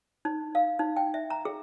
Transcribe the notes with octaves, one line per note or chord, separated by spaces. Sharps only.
D#4
F5
D#4
G5
E5
A#5
G#4